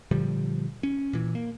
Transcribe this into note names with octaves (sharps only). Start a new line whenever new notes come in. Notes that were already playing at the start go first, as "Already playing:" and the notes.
A#2 D3 F3 G3
C#4
A#2 E3
A#3